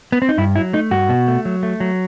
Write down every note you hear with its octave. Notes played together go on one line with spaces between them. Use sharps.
B3
C4
D#4
G2 E4
F#3 E4
A3 D#4
G2 F#4
B2
A3
F#3
A3
F#3